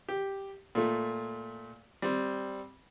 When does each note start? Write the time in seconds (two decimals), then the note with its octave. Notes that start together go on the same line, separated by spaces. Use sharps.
0.09 G4
0.75 A#2 A3
2.02 G3 C4